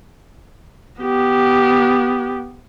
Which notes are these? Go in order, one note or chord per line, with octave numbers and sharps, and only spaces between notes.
B3 G4